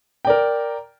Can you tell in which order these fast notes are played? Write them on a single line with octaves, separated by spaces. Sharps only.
G5 D5 A#4